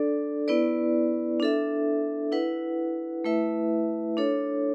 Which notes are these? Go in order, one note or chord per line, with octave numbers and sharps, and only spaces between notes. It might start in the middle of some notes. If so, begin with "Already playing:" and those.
Already playing: D4 A4 D5
B3 E4 B4 D5
D4 A4 E5
E4 B4 F#5
A3 E4 B4 E5
D4 A4 C#5